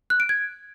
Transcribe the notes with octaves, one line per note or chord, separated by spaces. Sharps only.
F#6
D7
G#6